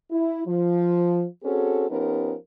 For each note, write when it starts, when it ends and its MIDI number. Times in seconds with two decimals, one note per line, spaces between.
0.11 0.42 64
0.46 1.25 53
1.44 1.88 60
1.44 1.88 61
1.44 1.88 66
1.44 1.88 68
1.44 1.88 69
1.90 2.35 53
1.90 2.35 59
1.90 2.35 61
1.90 2.35 63
1.90 2.35 67
1.90 2.35 70